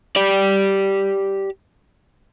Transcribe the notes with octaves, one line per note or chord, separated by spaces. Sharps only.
G4 D5